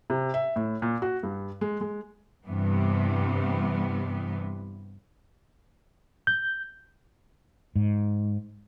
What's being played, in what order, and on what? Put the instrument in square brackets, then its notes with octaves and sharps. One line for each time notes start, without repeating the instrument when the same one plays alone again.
[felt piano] C3
E5
A2
A#2
F#4
G2
G#3
G#3
[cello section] G2 C3 E3 B3
[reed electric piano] G6
[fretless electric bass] G#2